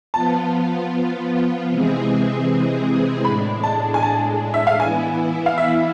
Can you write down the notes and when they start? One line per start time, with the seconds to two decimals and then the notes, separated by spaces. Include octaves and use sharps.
0.14 F3 B3 F4 A5
1.69 C3 E3 G#3 C4 G#4
3.25 A2 G#3 D4 B5
3.63 A5
3.94 G#5
4.03 A5
4.54 E5
4.67 F5
4.80 E3 B3 E4 G#5
5.46 F5
5.58 E5